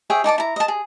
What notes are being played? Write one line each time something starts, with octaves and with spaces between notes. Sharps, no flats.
G#4 C#5 E5 G5
D#4 D5 A5 D6
E4 A#5
D#5 A5
G#4